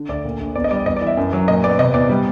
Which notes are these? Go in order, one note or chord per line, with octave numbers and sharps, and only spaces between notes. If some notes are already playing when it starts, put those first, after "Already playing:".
Already playing: D3
D2 D5
A#2
A#1
E2 D5
D#5
G3 D5
E2 D#5
D5
E3
E5
F#2
F#3
A#2 D#5
B3 D5
C3 D#5
E2 D5
G3